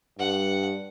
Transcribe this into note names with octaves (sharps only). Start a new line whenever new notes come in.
G2 F#5